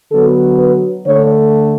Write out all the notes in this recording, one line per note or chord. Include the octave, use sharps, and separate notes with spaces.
D3 F#3 B3 A4
B4
D3 A3 C#5